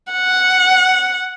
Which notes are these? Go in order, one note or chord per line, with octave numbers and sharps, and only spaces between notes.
F#5